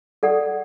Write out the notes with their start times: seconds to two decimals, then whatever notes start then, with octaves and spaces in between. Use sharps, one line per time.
0.23 A4 D5 F#5